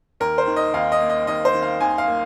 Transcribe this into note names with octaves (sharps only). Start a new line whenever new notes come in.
D#2 A#4
C5
D#3
D#5
D#2 F5
D#5
A#3
D#5
D#2 D#5
C5
D#3
F5
D#2 G#5
F5
A#3